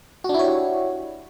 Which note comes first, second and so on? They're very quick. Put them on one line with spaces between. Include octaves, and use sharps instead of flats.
F#4 D4 E4 C#5 G4